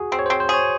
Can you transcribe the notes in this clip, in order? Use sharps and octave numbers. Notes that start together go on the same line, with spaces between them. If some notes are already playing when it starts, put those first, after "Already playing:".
Already playing: F#4 G#4
C4
C#5
C4 C5
C5
G#4 C#5